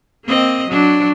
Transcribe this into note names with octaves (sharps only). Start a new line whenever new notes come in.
A#3 C4 D#5
F#3 D4